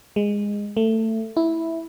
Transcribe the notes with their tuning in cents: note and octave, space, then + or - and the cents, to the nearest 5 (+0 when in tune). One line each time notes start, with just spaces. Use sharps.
G#3 -15
A3 +20
E4 -5